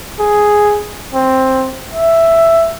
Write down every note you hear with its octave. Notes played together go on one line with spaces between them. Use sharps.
G#4
C4
E5